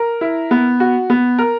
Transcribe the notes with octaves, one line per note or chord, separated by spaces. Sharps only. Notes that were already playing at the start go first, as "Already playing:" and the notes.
Already playing: A#4
E4
B3
F#4
B3
A#4